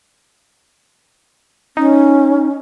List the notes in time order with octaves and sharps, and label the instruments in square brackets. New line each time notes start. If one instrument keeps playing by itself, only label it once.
[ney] C#4 [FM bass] D#4